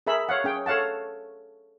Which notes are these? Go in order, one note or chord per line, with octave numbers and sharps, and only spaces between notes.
G#4 A#4 E5 B5
C#5 F5 F#5
C#4 G#4 G5
A4 C#5 F5 F#5 A5